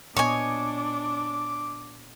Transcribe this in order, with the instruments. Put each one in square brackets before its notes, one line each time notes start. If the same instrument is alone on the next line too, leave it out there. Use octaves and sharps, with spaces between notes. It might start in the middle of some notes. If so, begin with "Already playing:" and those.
[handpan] A#2 B3 D#5 [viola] D4 [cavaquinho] C#5 G#5 [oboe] D6